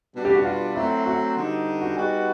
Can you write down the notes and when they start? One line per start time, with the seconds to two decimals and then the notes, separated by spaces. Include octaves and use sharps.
0.15 B2 G3 B3 D4
0.25 G4
0.35 F#4
0.45 F4
0.75 F#3 A3 C4 E4
1.06 F#4
1.36 D3 G3 B3 D#4
1.81 F#4
1.96 G3 B3 D#4 F#4 G#4